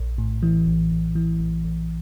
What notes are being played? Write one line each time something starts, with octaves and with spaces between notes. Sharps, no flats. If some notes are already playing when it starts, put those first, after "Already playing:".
Already playing: A#1
A2
E3
A#1
A#1
E3
A#1
A#1